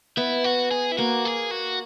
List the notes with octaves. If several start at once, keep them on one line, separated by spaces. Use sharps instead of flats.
B3 E4
F#4
G#4
E4
A#3 F#4
G#4
F#4